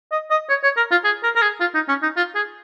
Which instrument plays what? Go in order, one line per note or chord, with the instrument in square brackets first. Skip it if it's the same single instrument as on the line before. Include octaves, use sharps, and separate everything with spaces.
[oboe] D#5
D#5
C#5
C#5
A#4
F4
G#4
A#4
A#4
G#4
F4
D#4
C#4
D#4
F4
G#4